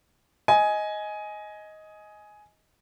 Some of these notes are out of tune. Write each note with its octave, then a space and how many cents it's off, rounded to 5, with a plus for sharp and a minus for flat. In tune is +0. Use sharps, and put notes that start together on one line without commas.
D#5 +10 G#5 +10